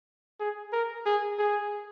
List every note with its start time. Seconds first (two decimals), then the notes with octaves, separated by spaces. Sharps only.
0.40 G#4
0.73 A#4
1.06 G#4
1.38 G#4